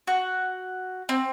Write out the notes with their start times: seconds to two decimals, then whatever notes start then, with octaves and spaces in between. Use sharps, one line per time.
0.07 F#4
1.09 C4